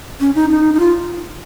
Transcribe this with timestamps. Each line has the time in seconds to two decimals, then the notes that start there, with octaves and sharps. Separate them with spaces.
0.20 C#4
0.35 D#4
0.50 D#4
0.74 D#4
0.80 F4